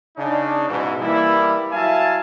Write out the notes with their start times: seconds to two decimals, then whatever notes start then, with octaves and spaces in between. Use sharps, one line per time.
0.17 C#3 D4 D#4
0.68 G#2 B2 E3
1.01 E3 G3 A#3 E4
1.72 F#3 E4 E5 F5 G#5 A5